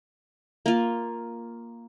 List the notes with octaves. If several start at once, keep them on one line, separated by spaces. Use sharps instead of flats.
A#3 F4